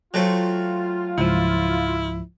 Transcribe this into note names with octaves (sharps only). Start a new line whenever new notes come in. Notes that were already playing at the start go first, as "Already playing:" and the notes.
F#3 A3 C4 F4
C#2 G#2 F3 E4